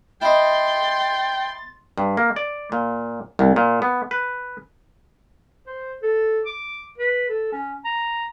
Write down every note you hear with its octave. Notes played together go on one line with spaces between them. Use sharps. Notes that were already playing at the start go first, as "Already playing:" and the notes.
E4 D#5 G5 C6 A6
G2
A#3
D5
A#2
C2
A#2
B3
B4
C5
A4
D6
B4
A4
C#4
A#5